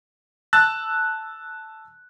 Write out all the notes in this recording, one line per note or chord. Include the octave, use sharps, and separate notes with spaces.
A5 E6 F#6 A6